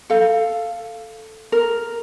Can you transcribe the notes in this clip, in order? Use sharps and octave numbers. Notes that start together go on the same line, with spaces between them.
A4 F5
A#4